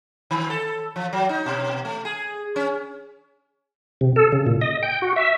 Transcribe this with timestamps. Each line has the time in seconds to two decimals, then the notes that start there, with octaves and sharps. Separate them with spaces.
0.31 D#3
0.50 A4
0.96 F3
1.13 F#3
1.29 D#4
1.46 B2
1.85 A3
2.05 G#4
2.56 C#4
4.01 C3
4.16 A4
4.32 C#3
4.47 A#2
4.61 D#5
4.83 G5
5.02 F#4
5.16 E5